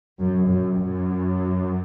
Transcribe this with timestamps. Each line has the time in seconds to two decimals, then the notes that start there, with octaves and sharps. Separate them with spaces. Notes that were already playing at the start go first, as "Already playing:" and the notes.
0.19 F#2
0.47 F#2
0.76 F#2